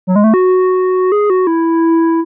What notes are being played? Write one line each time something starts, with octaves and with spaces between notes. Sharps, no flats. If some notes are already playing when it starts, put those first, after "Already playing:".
F#3
G#3
A3
F#4
G#4
F#4
E4